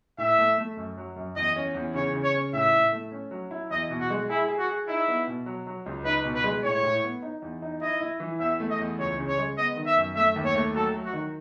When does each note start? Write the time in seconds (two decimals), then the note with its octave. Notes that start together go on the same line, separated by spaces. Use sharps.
0.18 A2 E5
0.38 A3
0.58 A3
0.77 F#2
0.97 F#3
1.16 F#2
1.36 E2 D#5
1.56 C#4
1.74 E2
1.94 C#3 C#5
2.14 C#3
2.23 C#5
2.34 C#4
2.53 A2 E5
2.73 A2
2.92 A3
3.12 C#4
3.31 F#3
3.51 E4
3.71 E2 D#5
3.90 B2
4.00 F#4
4.10 G#3
4.30 E4 G#4
4.48 G#4
4.58 F#4
4.69 G#4
4.88 D#4 E4
5.08 B3
5.27 B2
5.46 F#3
5.67 F#3
5.86 C#2
6.05 D#4 B4
6.24 B2
6.35 B4
6.44 G#3
6.63 A2 C#5
6.83 A2
7.04 B3
7.22 D#4
7.42 E2
7.62 D#4
7.82 E4 D#5
8.01 E4
8.20 E3
8.40 E2 E5
8.60 A3
8.70 D#5
8.79 E2
8.99 C#2 C#5
9.18 C#3
9.28 C#5
9.38 G#3
9.57 B3 D#5
9.76 D#3
9.86 E5
9.96 F#2
10.15 A3 E5
10.36 D#2
10.45 C#5
10.55 A3
10.74 F#3 A4
10.94 F#3
11.05 F#4
11.13 D#3